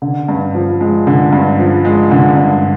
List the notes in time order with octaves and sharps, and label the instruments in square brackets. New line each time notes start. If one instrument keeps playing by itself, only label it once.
[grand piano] D3
G2
F3
G#3
D3
G2
F3
G#3
D3
G2